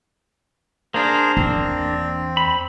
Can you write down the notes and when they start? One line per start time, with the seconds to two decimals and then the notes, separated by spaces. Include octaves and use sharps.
0.94 A#3 D4 G#4 A#4 C5
1.37 E2 C4
2.37 B5